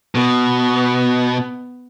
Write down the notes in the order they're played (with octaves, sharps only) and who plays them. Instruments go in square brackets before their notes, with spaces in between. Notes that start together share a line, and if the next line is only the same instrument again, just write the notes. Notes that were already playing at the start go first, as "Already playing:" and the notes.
[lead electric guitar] B2 [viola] B3